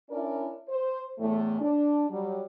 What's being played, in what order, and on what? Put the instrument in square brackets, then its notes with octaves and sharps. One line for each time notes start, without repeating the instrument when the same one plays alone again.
[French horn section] C#4 D4 E4 A#4 D5
C5
E2 A2 A3
D4
F#3 G3